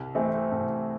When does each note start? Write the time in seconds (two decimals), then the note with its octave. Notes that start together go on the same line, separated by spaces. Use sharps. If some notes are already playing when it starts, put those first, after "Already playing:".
Already playing: C2
0.15 C3 E3 A3 C4
0.52 C2